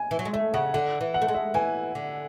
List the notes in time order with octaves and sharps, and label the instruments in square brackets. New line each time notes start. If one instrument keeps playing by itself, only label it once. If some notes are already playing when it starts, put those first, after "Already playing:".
Already playing: [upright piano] G#5
[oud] E3
F#3
G#3
[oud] A3 [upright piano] E5
[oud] C#3 [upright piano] F#5
[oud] D3 [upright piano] F#5
[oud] E3
[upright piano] F#5
[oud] A3
G#3
[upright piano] E5
[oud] E3 [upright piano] G#5
[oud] D3